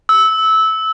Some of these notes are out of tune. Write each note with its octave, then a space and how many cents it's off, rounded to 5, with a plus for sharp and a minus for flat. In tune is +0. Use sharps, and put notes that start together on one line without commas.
E6 -15